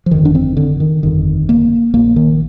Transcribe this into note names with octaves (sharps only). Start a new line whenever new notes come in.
F3
G1 F2 D3 D#3
D4
C4
D3
D#3
G1 F2 D3 D#3
A#3
A#1 A#2 A#3
D#3